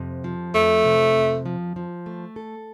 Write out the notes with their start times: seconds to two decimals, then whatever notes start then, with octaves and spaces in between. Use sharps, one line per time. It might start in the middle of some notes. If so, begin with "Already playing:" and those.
Already playing: F2 C3
0.24 F3
0.54 F2 A3
0.85 C3
1.15 F2
1.46 F3
1.76 F3
2.06 A3
2.36 A4